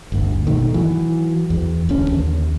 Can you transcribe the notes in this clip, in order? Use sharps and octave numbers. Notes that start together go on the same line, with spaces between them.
G1 D2
B2 D#3 A3
E3 F#3
E2
D1 A1 D3 C#4
D#2